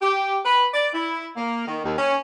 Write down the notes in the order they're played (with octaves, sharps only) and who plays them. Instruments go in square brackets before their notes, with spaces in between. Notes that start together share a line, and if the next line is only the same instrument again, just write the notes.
[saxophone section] G4
B4
D5
E4
A#3
D#3
D#2
C#4